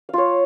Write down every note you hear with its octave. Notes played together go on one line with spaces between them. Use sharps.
F4 C#5 F5